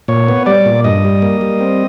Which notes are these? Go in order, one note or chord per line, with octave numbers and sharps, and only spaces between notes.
A#2 C#5
B3
G3 D5
A#2
G2 D#5
G3
A#3
G3
C4